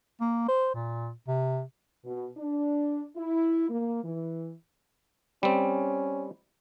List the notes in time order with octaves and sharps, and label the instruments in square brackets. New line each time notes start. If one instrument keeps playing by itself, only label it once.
[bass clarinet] A#3
C5
A#2
C3
[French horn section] B2
D4
E4
A#3
E3
[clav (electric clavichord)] G3 C4 [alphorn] C#4